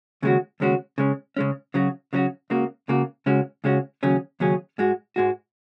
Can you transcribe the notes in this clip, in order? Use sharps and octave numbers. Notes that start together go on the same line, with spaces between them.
D#2 C#3 G#3 C#4 F#4
D#2 C#3 G#3 C#4 F#4
C#3 G#3 C#4
C#3 G#3 C#4
C#3 F#3 C#4 F#4
C#3 F#3 C#4 F#4
C#2 C#3 A#3 F#4
C#2 C#3 A#3 F#4
C#2 C#3 G#3 C#4 F#4
C#2 C#3 G#3 C#4 F#4
D#2 C#3 F#3 C#4 G#4
D#2 C#3 F#3 C#4 G#4
G#2 G#3 F#4
G#2 G#3 F#4